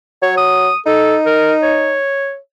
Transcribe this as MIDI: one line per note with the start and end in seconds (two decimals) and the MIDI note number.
0.23 0.70 54
0.23 0.33 73
0.37 0.78 87
0.86 1.98 63
0.86 1.16 69
1.26 1.53 70
1.63 2.37 73